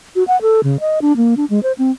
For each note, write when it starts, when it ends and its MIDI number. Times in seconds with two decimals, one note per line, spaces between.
0.16 0.24 66
0.28 0.40 78
0.42 0.61 69
0.64 0.77 49
0.80 0.99 75
1.02 1.16 62
1.17 1.34 58
1.37 1.45 62
1.50 1.62 56
1.63 1.72 72
1.78 1.91 60